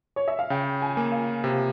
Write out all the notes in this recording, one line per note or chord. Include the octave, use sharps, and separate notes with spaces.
C#5
E5
F5
C#3 G5
G#5
A#3
F5
C3